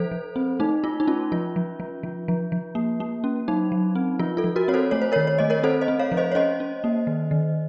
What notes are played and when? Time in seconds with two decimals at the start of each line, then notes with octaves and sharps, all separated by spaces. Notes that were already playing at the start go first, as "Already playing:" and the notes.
Already playing: F3 A4 C5
0.12 F3
0.36 C4
0.60 A3 D#4
0.84 A3 F4
1.00 D#4
1.07 C#4 F4
1.32 F3 F4
1.56 F3
1.80 F3
2.03 F3
2.28 F3
2.52 F3
2.75 A#3
3.00 A#3
3.24 C#4
3.48 F#3 D#4
3.72 F#3
3.95 C4
4.19 F3 F4
4.37 F4 A4
4.44 F3
4.56 F#4 A#4
4.68 C4 C#5
4.74 A4 C5
4.91 A3 C#5
5.02 C5
5.12 D#3 A#4 C#5
5.27 C#5
5.38 A3 D#5
5.50 A#4 C#5
5.63 C4 A4 C5
5.81 C5 D#5
5.88 C4
5.99 C#5 F5
6.12 F3
6.17 C5 D#5
6.32 C#5
6.35 C#4 C5 D#5
6.60 C#4
6.84 A#3
7.07 D#3
7.31 D#3